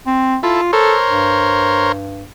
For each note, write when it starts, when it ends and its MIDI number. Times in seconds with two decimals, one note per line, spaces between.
0.06 0.37 60
0.43 0.61 64
0.43 0.70 65
0.43 0.61 69
0.73 0.95 69
0.73 1.92 70
0.73 1.92 72
0.73 1.92 73
1.07 2.26 43